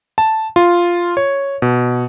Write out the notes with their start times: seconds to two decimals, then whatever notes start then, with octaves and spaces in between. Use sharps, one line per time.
0.18 A5
0.56 F4
1.17 C#5
1.62 B2